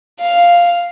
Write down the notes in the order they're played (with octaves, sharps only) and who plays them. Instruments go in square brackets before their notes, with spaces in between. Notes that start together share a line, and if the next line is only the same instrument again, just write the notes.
[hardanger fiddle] F5